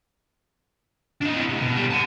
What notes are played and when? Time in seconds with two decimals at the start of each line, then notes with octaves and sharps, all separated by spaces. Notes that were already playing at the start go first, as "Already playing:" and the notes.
1.21 D4 D#5
1.33 C4 E4
1.49 A2 C3
1.61 B2
1.76 B2 G3
1.91 F#5 A5